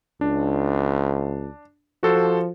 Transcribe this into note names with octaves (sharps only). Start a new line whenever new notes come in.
C#2 D4
F3 F#4 A4 C5